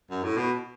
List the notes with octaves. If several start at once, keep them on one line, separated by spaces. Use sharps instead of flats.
F#2
A2
B2